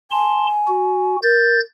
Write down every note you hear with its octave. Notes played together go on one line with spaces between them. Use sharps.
G#5 A5 C6
F#4
A#4 G6 A6